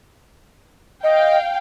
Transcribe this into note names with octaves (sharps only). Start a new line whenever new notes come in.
D#5 F5 G5